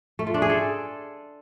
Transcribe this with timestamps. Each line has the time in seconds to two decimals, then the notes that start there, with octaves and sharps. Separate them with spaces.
0.19 A3
0.27 F4
0.34 D4
0.42 G#4
0.50 A4